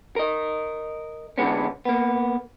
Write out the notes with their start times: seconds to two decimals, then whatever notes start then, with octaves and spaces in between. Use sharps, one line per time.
0.16 A#4 D#5
1.38 D3 E3 F3 G#3 B3 C#4
1.85 A#3 B3